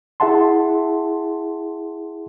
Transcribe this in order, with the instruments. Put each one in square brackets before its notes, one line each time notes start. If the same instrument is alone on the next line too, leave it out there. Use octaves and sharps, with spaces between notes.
[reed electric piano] E4 G#4 E5 F#5 A5 C6